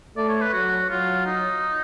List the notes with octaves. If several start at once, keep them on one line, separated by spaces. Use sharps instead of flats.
A3 D5
C#5
B4
F#3 F#4
F#3 F4
D#4